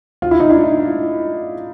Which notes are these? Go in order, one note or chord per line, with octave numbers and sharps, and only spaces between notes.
F4
E4
D#4
D4 E4